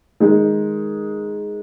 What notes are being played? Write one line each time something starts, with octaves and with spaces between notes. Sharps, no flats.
D#3 G#3 D#4 G#4